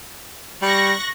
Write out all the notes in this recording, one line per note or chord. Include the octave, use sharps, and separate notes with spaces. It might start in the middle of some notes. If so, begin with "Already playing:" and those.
G3 C#6 F#6 A#6